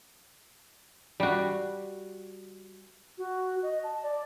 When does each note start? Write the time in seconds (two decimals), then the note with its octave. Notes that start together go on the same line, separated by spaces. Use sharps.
1.20 G3 F#4
3.18 F#4
3.63 D#5
3.84 A5
4.03 D5